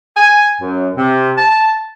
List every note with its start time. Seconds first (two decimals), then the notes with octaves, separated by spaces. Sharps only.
0.17 G#5
0.61 F#2
0.98 C3
1.38 A5